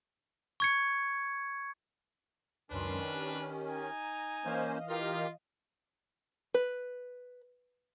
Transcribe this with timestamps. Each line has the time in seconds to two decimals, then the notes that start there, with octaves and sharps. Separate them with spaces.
0.60 C#6 G#6 C#7
2.71 C#2 F#2 D#3 C#4 D4 B4 C6
3.13 G4
3.68 D#4 G#5
4.02 A#5
4.45 E3 A#3 C#4 C5 D#5 F5
4.89 F4 G4 A#4
6.54 B4